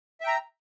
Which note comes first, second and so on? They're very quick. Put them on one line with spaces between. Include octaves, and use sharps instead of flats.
E5 G5 A#5